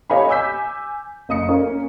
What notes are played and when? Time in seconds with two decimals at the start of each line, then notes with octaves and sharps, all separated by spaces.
0.10 G4 C#5 D#5 F5 G#5 B5
0.29 G#5 D6 E6 G6 B6
1.29 F#1 D#5 D#6 C#7
1.49 A#3 C#4